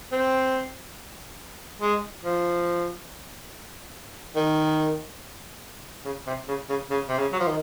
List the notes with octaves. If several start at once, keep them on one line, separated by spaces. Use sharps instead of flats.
C4
G#3
F3
D#3
C#3
C3
C#3
C#3
C#3
C3
C#3
F#3
F3
D#3